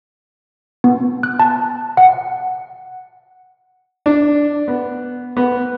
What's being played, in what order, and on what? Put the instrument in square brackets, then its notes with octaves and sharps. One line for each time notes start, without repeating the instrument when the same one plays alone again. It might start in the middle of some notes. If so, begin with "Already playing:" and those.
[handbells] B3
F#6
A5
F#5
[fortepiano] D4
B3
B3